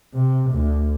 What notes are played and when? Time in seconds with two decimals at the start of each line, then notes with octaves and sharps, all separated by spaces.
0.14 C3
0.51 D2